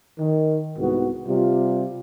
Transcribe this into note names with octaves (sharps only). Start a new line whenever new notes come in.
D#3
C2 G#2 B3 F#4
C3 G3 F4